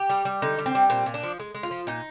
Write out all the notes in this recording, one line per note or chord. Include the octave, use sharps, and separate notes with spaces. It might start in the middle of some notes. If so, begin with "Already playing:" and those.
Already playing: G4
G3
G3
D3 D#4
G3
C4
G3
A#2 C4
A#2
D4
F3
G#3
G#3
F4
F3
A#2 D#4